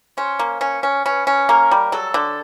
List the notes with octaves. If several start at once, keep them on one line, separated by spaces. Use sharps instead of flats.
C#4 C5
A#3
C#4
C#4
C#4 B4
C#4
A#3 A#4
G3
F#3 A4
D3